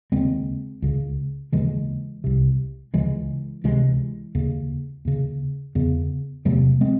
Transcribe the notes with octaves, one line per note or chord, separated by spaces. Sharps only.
D#2 C#3 G#3 C4
C#2 C#3
D#2 C#3 E3 G#3
C2 C3
C#2 C#3 E3 G#3
C#2 C3 E3 G#3
D#2 C#3
D#2 C#3
E2 C#3
E2 C3 F#3 A3
G#3 C4